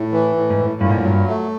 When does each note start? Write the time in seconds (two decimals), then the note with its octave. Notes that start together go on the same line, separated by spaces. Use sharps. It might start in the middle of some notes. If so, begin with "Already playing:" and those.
Already playing: A2
0.12 E3
0.36 A2
0.50 G#2
0.58 A2
0.81 G2 A#2
0.90 G#2
1.00 G2 F#3
1.28 A3